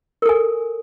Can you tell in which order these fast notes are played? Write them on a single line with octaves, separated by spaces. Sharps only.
A#4 A4 G#5